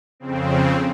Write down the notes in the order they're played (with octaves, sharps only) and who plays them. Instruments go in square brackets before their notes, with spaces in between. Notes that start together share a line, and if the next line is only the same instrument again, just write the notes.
[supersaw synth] F2 C#3 C4